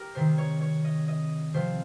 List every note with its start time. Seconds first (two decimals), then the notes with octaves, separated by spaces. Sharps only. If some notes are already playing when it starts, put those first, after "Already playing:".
Already playing: G4 A#4
0.15 C3 D#3 C5
0.38 C#5
0.61 C#5
0.84 D#5
1.08 D#5
1.54 C3 F3 C5